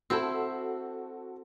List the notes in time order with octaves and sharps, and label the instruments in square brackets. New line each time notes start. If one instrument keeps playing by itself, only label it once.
[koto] C4 E4 G5 [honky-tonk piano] F#4 A4